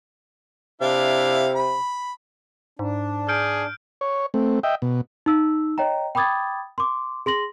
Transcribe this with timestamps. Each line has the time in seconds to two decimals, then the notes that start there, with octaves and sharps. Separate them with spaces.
0.82 C3 D4 E4 F5
1.55 B5
2.79 G#2 D4
3.29 G#4 F6 G6 D7
4.01 C#5
4.34 A3 C4
4.63 D#5 E5 G5
4.82 B2
5.26 D#4 E6
5.78 C#5 D#5 G5 A#5
6.15 G5 B5 D6 D#6 G#6 A6
6.78 C6 D6
7.26 G#4 C6 A#6 F#7